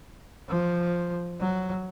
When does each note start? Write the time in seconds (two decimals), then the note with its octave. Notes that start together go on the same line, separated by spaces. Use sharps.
0.48 F3
1.39 F#3